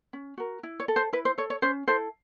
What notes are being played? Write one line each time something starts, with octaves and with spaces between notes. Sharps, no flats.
C#4
F#4 A#4
E4
C#5
A4
C5
E4 B4
C5
A4 C#5
C#5
C#4 C5
E4 A4 C5